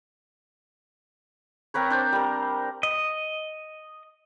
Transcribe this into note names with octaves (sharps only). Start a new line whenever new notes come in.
C4 A#4 B4 C#5
D4 C5
G3 A#4
D#5